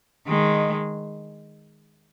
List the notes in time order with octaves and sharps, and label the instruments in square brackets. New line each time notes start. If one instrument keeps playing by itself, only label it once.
[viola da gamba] D#3 G#3